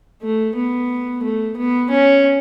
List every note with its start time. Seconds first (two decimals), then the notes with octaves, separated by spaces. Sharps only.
0.22 A3
0.55 B3
1.23 A3
1.57 B3
1.90 C#4